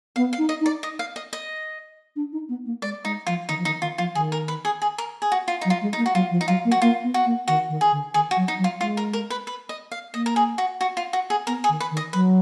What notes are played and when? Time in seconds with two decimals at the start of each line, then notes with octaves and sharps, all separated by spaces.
0.16 B3 F5
0.33 F5
0.38 D#4
0.49 D#5
0.61 D#4
0.66 D5
0.83 D#5
0.99 F5
1.16 D#5
1.33 D#5
2.16 D4
2.32 D#4
2.49 B3
2.66 A#3
2.82 G#3 D5
3.04 G#3 D#4
3.27 F3 F4
3.49 D#3 D#4
3.59 F3
3.65 D#3 D#4
3.82 D#3 F4
3.98 F3 F4
4.15 D#3 G#4
4.32 A#4
4.48 B4
4.65 G#4
4.82 G#4
4.98 A#4
5.22 G#4
5.32 F#4
5.48 F4
5.61 D#4
5.65 F#3
5.70 F4
5.81 G#3
5.93 D#4
5.98 A#3
6.06 F#4
6.14 F#3 F4
6.31 F3
6.41 D#4
6.48 F#3 F4
6.65 A#3
6.71 F#4
6.81 A#3 F4
7.03 B3
7.14 F#4
7.26 A#3
7.48 D#3 F#4
7.69 D#3
7.81 G#4
7.92 D3
8.14 D#3 G#4
8.31 F#4
8.36 F#3
8.48 D#4
8.58 F#3
8.64 F4
8.80 G#3 F4
8.97 A#4
9.13 A#4
9.30 B4
9.47 B4
9.69 D#5
9.92 F5
10.14 A#3 D#5
10.26 A#4
10.36 G#4
10.58 F#4
10.81 F#4
10.97 F4
11.13 F#4
11.30 G#4
11.47 B3 A#4
11.64 G#4
11.69 D#3
11.80 B4
11.91 D#3
11.97 D#5
12.13 F#3 B4